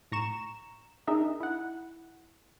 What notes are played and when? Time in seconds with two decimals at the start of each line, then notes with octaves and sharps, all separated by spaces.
0.12 A2 A#5 C#6 E7
1.07 D4 D#4 G#4 A#4 D#5 E5
1.40 E4 F#5